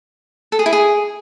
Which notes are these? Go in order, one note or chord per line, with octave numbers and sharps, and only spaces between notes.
A4
G#4
E4
G#4